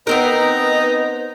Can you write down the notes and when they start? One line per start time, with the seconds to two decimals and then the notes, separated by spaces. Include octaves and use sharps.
0.07 B3 C4 D#4 A#4 B4 D#5